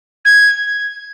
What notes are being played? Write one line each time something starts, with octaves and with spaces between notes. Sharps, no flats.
G#6